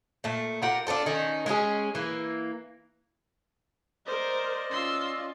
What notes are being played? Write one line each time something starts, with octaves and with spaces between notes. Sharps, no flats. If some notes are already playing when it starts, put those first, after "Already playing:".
A#2 A3
F4 G4 A#4 F#5
D4 F4 A4 C5
D#3 C#4 D#4
G#3 C#4 E4 G#4
E3 A#3
A#4 C5 D5 D#5
C#4 F4 C6 E6